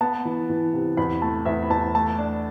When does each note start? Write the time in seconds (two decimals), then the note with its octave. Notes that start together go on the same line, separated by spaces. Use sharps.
0.01 B3 A5
0.25 E3
0.50 E3
0.73 C3
0.97 E2 B5
1.22 A3 A5
1.45 E2 E5
1.63 B5
1.70 E2 A5
1.95 A3 A5
2.18 D4